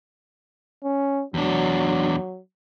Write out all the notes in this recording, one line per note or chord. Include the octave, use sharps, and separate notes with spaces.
C#4
E2 F#3 D4